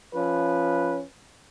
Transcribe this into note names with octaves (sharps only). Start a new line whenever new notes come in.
F3 C#4 B4